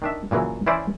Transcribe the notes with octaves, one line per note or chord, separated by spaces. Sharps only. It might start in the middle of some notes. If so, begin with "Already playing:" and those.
D#3 D4 E5
A#2 C#3 E3 F#3
E3 C#4 E4 C5 D5